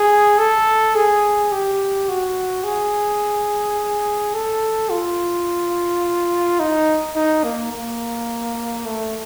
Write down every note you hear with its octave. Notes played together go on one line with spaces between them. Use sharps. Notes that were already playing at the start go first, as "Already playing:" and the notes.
Already playing: G#4
A4
G#4
G4
F#4
G#4
A4
F4
D#4
D#4
A#3
A#3
A3